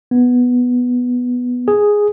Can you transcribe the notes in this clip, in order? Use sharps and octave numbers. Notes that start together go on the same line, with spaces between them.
B3
G#4